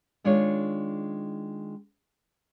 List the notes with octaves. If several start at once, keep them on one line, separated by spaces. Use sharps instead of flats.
D#3 G#3 D4 F4 C#5